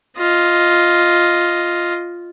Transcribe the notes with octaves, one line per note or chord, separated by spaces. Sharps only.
F4 D#5